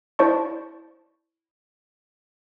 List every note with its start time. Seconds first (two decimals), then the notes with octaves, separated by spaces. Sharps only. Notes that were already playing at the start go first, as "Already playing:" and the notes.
0.19 E4 C5 D5 A5 C#6